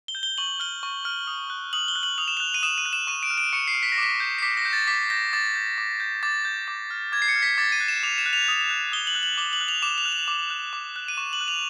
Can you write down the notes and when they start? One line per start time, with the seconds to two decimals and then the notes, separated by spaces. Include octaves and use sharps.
0.08 G7
0.15 G6
0.23 G7
0.38 C#6 F#7
0.60 F6 G7
0.83 C#6
1.05 F6
1.27 D#6
1.50 F#6
1.73 D#6 F#7
1.88 G7
1.96 F#6
2.03 F#7
2.18 D#6 F7
2.28 E7
2.37 F#6 F7
2.54 D#7
2.63 D#6 E7
2.78 D#7
2.86 F#6
2.93 E7
3.07 C#6 D#7
3.23 D7
3.30 F6
3.38 D7
3.53 C#6 C#7
3.68 C7
3.75 F6
3.83 B6
3.92 A#6
3.98 D6
4.03 B6
4.20 G6
4.38 C7
4.42 D6 B6
4.57 A#6
4.65 G6
4.73 A6
4.87 D6 B6
5.10 G6 A#6
5.33 D6 A6
5.55 G6
5.78 D6
6.00 G6
6.23 D6 A6
6.45 G6
6.68 D6
6.91 F6
7.12 D6 G#6
7.22 C7
7.28 C#7
7.36 F6
7.42 B6
7.58 D6 A6
7.72 D#7
7.80 F#6
7.88 E7
8.03 D6 F7
8.18 E7
8.26 F#6
8.33 F7
8.48 D#6
8.70 F#6
8.92 D#6 G7
9.07 F#7
9.15 F#6
9.23 F#7
9.38 D6 G7
9.53 F#7
9.61 F#6
9.68 F7
9.82 D6 E7
9.98 F7
10.05 F#6
10.13 F7
10.28 D6
10.50 F#6
10.73 D6
10.96 F#6
11.08 D#7
11.17 C#6 E7
11.33 F#7
11.41 F#6
11.48 F7